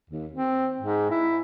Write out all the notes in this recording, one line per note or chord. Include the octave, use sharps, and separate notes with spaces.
D#2
C4
G#2
E4